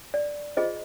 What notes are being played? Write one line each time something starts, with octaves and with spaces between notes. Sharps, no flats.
D5
F4 G#4 C5 D#5